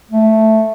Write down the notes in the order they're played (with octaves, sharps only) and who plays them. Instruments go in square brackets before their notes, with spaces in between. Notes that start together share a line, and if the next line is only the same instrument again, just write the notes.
[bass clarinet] A3